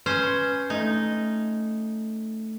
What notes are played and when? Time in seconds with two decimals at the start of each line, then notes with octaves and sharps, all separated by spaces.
0.06 C#4 B4 C5
0.70 A3 D#4